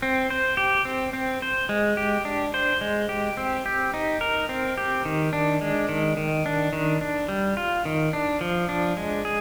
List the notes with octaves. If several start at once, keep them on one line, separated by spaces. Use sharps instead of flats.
C4
C5
G4
C4
C4
C5
G#3
G4
D4
C5
G#3
G4
C4
G4
D#4
A#4
C4
G4
D#3
D4
G#3
D#3
D#3
D4
D#3
D4
G3
F4
D#3
D4
F3
D4
G#3
G#4